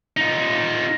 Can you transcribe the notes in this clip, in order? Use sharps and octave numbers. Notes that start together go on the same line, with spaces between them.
D#4 F4